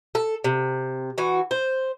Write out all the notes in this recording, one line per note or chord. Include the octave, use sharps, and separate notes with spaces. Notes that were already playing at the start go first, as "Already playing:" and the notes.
A4
C3
E3 F#4
C5